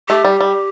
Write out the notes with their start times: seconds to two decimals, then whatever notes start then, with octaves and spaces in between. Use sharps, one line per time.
0.09 A3 G4
0.25 G3
0.41 G3